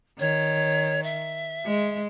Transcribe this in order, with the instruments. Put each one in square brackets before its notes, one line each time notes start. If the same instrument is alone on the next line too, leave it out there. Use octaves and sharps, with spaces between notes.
[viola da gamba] D#3 [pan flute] C#5
[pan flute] E5
[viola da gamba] G#3